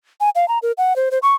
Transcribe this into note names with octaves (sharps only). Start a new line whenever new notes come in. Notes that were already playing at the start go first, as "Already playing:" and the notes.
G#5
F5
A#5
A#4
F#5
C5
C5
C#6